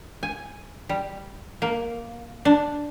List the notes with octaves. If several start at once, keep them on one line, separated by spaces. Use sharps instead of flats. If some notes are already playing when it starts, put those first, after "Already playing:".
G#5
G3
A#3
D4